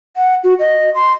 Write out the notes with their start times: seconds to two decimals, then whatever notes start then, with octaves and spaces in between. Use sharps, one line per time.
0.17 F#5
0.44 F#4
0.60 D#5
0.95 C6